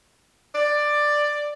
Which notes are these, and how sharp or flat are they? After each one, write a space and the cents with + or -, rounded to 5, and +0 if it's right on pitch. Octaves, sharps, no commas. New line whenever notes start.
D5 +10